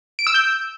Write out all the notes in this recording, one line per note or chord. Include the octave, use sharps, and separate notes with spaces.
D7
E6
G6